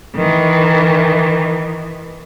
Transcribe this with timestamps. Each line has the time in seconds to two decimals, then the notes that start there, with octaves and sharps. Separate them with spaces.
0.16 D#3 E3